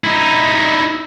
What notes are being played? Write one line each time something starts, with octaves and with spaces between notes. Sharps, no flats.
D#4 E4